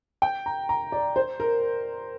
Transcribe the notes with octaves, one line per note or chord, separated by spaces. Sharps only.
G5
A#5
A#5
D5
C5
A#4